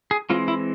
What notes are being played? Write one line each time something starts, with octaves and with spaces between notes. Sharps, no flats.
G#4
E3 G#3 C4 F4
E4